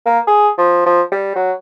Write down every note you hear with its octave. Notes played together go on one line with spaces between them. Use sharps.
A#3
G#4
F3
F3
G3
F#3